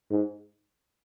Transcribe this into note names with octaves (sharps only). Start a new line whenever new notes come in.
G#2